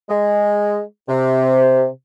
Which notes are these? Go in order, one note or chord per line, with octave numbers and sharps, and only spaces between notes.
G#3
C3